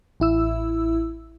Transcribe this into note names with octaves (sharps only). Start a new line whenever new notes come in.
A1 E4 E6